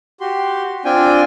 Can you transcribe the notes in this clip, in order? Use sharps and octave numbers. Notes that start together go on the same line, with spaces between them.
F#4 G4 C6
C4 D4 F4 G5 G#5